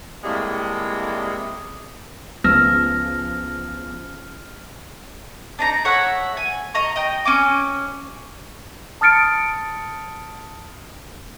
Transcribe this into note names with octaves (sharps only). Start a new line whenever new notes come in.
A2 C3 G3 G#3 A#3
C#2 C#3 F3 A3 B3 E6 F6 A#6
D4 D#4 A#5
C#5 E5 F#5
G#5
D#5 A#5 C#6
D#5 G5
C#4 G#5 D6
A5 D#6 F6 A6 C#7 D7